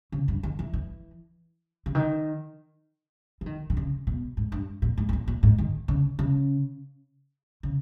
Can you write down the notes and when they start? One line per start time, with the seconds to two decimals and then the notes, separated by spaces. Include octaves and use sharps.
0.12 C#3
0.28 G2
0.43 D#3
0.59 E3
0.74 E3
1.86 C#3
1.95 D#3
3.41 E3
3.46 D#3
3.70 D#3
3.77 C#3
4.07 B2
4.37 G#2
4.52 G2
4.82 A#2
4.98 G#2
5.09 G#2
5.13 A#2
5.28 A#2
5.43 G#2
5.58 D#3
5.88 C#3
6.19 C#3
7.63 C#3